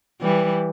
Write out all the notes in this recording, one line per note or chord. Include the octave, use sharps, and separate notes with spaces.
E3 G3